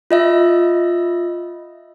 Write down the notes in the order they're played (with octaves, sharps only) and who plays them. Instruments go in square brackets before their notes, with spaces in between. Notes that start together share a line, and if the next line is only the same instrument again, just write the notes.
[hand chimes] F4 D#5 E5